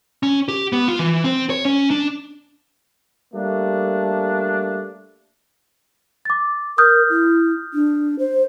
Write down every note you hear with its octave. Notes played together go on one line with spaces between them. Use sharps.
C#4
G4
B3
F4
E3
C4
C#5
C#4
D4
G3 A3 A#3 D4
D6 A6
A#4 D#6 F6 G6
E4
D4
C5